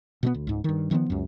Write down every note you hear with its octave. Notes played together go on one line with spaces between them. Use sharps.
B2 A3 B3
D2
C#2 G#2
G2 D#3
D#3 F3 A3 B3
C#2 F#2